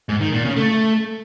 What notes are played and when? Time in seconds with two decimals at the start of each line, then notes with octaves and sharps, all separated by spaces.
0.09 G#2
0.21 D#3
0.33 A#2
0.44 C#3
0.56 A3